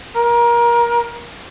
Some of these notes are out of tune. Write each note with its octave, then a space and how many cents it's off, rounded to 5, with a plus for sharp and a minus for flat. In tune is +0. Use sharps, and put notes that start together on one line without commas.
A#4 +25